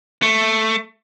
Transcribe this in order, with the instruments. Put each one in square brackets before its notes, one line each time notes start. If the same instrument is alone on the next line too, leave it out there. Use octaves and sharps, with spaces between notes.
[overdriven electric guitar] A3